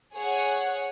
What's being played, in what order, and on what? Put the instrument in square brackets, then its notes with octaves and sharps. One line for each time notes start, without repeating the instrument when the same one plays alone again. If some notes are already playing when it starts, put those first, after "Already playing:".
[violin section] G#4 C#5 F#5